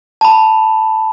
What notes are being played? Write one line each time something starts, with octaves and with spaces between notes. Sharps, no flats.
A5 B5